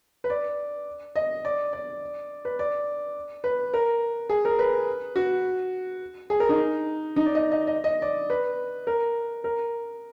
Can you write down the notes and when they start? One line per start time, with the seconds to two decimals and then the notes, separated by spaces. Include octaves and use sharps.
0.24 B4
0.30 D5
1.16 D#5
1.45 D5
1.73 D5
2.45 B4
2.59 D5
3.44 B4
3.74 A#4
4.30 G#4
4.45 A#4
4.59 B4
5.16 F#4
6.30 G#4
6.40 A#4
6.49 D#4
7.16 D#4
7.26 D5
7.35 D#5
7.52 D#5
7.67 D#5
7.84 D#5
8.02 D5
8.30 B4
8.87 A#4
9.44 A#4